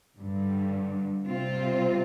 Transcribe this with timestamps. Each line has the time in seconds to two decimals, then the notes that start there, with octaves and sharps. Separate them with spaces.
0.19 G2 D3 G3
1.25 C3 G3 C4 F4